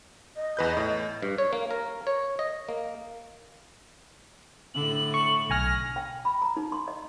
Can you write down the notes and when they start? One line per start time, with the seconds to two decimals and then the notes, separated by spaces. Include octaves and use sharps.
0.36 D#5
0.57 E2 B4 G6
0.77 A2
1.22 G2
1.38 C#5
1.53 A#3
1.71 A#4
2.07 C#5
2.39 D#5
2.69 A#3
4.74 A2 D3 F#7
5.14 C#6
5.50 B1 G#5 F6 A#6
5.96 G5
6.25 B5
6.42 A#5
6.57 D#4
6.72 C6
6.88 D#5